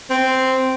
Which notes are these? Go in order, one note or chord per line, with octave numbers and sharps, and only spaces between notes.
C4